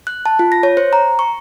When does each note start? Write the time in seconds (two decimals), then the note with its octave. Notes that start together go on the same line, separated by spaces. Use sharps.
0.07 F#6
0.26 A5
0.39 F4
0.52 A#6
0.63 C#5
0.77 C5
0.93 A#5
1.19 C#6